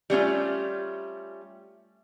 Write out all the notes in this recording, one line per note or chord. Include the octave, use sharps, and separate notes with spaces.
G3 A3 C#4 F4